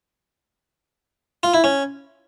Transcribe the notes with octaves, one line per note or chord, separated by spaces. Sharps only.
F4
E4
C#4